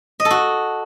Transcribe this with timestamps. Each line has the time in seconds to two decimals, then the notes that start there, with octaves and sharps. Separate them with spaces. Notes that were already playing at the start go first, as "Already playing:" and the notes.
0.20 D#5
0.25 A4
0.30 F#4